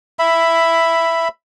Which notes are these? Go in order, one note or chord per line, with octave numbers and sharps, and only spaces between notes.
E5 B5